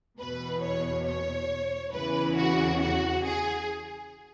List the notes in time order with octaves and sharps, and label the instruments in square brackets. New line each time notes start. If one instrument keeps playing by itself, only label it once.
[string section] E2 B2 B4
C#5
C#5
E2 C#3 E3 B4
F#4
F#4
G#4